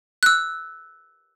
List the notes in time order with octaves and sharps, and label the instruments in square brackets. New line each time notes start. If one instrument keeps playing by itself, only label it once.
[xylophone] E6 F#6